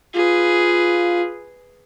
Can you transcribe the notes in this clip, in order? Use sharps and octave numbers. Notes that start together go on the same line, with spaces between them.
F4 G#4 B4